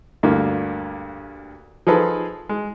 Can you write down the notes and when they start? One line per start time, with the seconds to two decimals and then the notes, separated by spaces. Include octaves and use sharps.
0.23 D2 G2 D3 A#3
1.87 F3 D#4 G#4 A4 B4
2.49 G#3